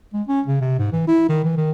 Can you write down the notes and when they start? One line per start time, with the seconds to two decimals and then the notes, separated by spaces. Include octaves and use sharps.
0.14 G#3
0.28 C#4
0.47 C#3
0.61 C3
0.79 G#2
0.93 E3
1.08 E4
1.29 D#3
1.44 E3
1.57 D#3